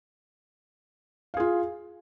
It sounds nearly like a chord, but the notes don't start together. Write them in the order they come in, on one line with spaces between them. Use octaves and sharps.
F5 G#4 F4